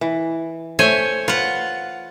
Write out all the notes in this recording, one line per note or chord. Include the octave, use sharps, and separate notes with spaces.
E3
A3 C5 C#5 E5 G#5
F4 B4 F#5